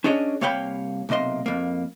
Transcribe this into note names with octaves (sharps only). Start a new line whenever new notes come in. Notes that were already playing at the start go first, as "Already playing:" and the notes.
C#4 D4 G#4 C#5 D#5
C2 A#3 C#5 F5 G5 B5
B1 C3 A#3 D#5 C6
F2 A#3